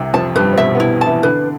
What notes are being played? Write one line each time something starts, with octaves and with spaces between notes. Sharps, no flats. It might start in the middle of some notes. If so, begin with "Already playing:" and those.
Already playing: C2 C3
F2 F3 A5
G2 G3 B4
C4
B2 B3 E5
B2 B3
E4
A5
E3 E4
D3 D4 B4